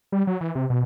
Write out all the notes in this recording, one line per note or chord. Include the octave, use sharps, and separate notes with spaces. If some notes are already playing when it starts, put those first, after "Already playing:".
G3
F#3
E3
C3
B2